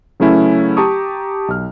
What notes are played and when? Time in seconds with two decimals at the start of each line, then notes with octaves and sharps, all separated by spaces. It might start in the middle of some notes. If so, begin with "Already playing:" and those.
0.20 C#3 F#3 A3 C#4 E4 B4
0.77 G4 A5 A#5 C#6 D#6
1.48 B1 F6